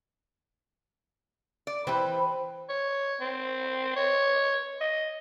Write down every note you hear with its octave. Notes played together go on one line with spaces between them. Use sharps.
D5
E3 C4 G4 B4
C#5
C4
C#5
D#5